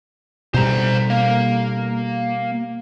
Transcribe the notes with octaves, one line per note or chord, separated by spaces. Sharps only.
B2 G3 C5 A#5
A#3